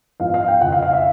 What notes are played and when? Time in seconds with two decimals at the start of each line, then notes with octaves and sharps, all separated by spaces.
0.20 G#2 F3 G#3 B3 F5
0.34 F5
0.48 G5
0.61 F2 C#3 F3 F#5
0.72 F5
0.82 F5
0.93 E5